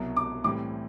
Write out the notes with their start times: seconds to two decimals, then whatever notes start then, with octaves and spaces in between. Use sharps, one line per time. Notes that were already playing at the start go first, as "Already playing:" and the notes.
Already playing: C2 B2 F#3
0.17 D6
0.44 A2 E3 G3 C4 D6